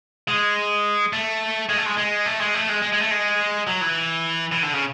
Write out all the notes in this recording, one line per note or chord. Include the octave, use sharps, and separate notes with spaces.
G#3
A3
G#3
A3
G#3
G#3
A3
G#3
A3
G#3
G#3
G#3
A3
G#3
F#3
E3
E3
D3
C#3